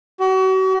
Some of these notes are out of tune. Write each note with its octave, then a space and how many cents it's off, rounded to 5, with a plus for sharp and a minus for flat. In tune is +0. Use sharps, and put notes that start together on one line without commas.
F#4 +40